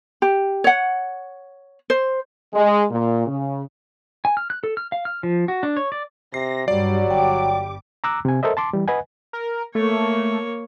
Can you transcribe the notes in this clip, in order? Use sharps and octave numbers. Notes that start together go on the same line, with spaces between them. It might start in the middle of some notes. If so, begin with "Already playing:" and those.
G4
C#5 F#5
C5
G#3
A#2
C#3
G#5
F6
F#6
A4
F6
F5
F6
F3
F#4
D4
C#5
D5
C3 A#6 C7
G2 F#3 G3 D5
G1 G3 G5 D6
A#5 D6 E6 F#6
C3 G#5
A4 A#4 C5 D#5 E5
A5 C6 D6
E3 G3
B4 D#5 F#5 G#5
A#4
A3 A#3 C#5